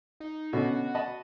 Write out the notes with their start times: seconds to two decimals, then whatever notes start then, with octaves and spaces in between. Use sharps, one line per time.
0.20 D#4
0.53 B2 D3 C#4 F#4
0.95 D#5 A5 B5